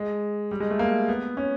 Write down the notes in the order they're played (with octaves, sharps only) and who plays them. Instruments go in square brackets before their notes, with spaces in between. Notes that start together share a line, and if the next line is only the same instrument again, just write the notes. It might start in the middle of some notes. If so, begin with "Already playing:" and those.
Already playing: [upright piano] G#3
G3
G#3
A3
A#3
B3
C#4